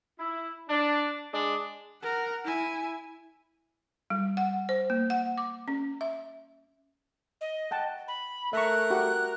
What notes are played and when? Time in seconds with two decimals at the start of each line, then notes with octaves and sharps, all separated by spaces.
0.19 E4
0.69 D4
1.33 G#3 D4
2.02 A#4 F#5
2.44 E4 G#5
4.10 G3
4.37 F#5
4.69 C5
4.90 A#3
5.10 F#5
5.38 D6
5.68 C#4
6.01 E5
7.41 D#5
7.71 F#5 G5 A5
8.08 B5
8.53 A3 A#4 E5 A#5 C#6 F#6
8.90 F#4 G4 F#5